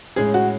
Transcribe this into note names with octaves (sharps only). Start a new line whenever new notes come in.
A2 G#3 C#4 G#4
F#4